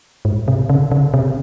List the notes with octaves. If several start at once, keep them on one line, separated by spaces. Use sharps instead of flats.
G#2
C3
C#3
C#3
C3